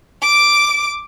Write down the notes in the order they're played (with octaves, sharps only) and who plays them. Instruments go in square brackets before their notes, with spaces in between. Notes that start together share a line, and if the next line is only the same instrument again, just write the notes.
[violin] D6 D7